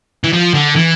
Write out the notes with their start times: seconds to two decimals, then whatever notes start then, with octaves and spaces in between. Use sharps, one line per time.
0.24 E3
0.33 F3
0.54 D3
0.76 E3